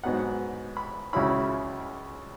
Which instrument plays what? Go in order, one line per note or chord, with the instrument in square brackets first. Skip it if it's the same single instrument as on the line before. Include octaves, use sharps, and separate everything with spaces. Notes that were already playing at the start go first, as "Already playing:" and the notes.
[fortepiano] G#2 F#3 B3 D#4 F#5
B5
C#2 C#3 F#3 C#4 E4 B5